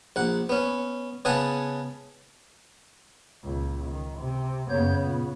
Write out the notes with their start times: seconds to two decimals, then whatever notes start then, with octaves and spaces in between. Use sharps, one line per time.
0.16 A#1 F#5
0.49 B3 C#4
1.25 C#3 B3 G#4 F#5 G#5 A5
3.44 C#2 A#2
3.90 D#3
4.19 C3
4.70 F#2 C#3 B3 C#5 G6
5.03 A#2